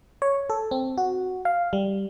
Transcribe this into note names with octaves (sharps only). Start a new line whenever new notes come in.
C#5
A4
C4
F#4
F5
G3